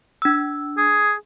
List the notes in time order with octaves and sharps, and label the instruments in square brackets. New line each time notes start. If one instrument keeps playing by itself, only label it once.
[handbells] D4 E6
[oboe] G#4